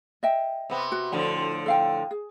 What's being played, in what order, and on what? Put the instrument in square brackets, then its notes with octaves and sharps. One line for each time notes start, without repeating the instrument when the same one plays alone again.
[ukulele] D#5 E5 G5
[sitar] C3 B3
[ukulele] F#4
[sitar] A2 D3 F3
[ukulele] A4 F5 G5
G#4